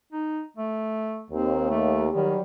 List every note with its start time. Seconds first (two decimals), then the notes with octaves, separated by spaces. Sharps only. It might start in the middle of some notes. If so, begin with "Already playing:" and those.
0.13 D#4
0.57 A3
1.31 D#2 C4
1.70 A3
2.13 D#3 F#3 G3